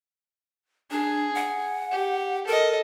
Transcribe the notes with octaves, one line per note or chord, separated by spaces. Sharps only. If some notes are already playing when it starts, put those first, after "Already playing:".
D4 G#4
F#5
G4
A4 A#4 D#5